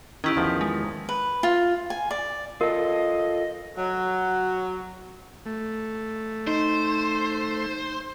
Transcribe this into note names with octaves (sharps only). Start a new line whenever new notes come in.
D#3 C#4 E4 G4
E2 D#3 F3
G#3
B4
F4
G#5
D5
F4 A4 A#4 D#5
F#3
A3
D#4 C5